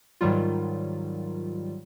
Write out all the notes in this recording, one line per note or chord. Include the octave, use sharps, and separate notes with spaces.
G#2 D#3 F#3 G3 F4